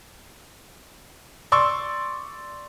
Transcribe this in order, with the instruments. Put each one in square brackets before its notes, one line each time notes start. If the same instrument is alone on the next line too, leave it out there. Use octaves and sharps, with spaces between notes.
[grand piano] D5 C6 C#6 E6